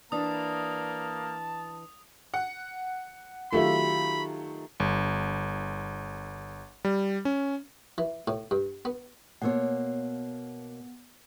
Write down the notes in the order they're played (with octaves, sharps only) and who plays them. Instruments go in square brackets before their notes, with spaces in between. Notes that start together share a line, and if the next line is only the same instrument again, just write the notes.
[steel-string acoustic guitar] E3 D4 E4 [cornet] A#3 [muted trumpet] A5 [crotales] D#6
[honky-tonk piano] F#5
[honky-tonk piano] D#3 F#3 A3 [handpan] F4 G4 E5 [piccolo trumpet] B5
[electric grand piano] G1
G3
C#4
[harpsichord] E3
A2
G2
B3
[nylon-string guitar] B2 A#3 C#5 [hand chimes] B3 F#5